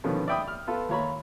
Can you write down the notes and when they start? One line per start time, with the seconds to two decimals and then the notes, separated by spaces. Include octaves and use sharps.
0.04 B2 D3 D#3 F3 B3 C#4
0.28 D5 E5 G5 B5 D#6
0.48 F6
0.67 B3 F4 A4
0.89 D#2 F4 C#5 A#5 B5